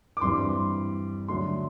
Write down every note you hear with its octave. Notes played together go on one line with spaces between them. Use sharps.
D6
G2 E3 G3 C4 C6
D3 F#3 A3 D4 C6